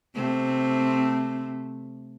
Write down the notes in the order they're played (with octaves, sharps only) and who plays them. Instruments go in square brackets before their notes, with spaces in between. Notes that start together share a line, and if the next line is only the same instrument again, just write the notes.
[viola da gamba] C3 A3 C4